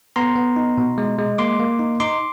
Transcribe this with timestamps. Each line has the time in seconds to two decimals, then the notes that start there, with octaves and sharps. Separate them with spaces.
0.16 B3 A#5 C6
0.36 B3
0.56 D#4
0.78 B2
0.98 G#3
1.18 G#3
1.38 A#3 C6 D6
1.59 A#3
1.79 D#4
2.00 D#4 C6 D6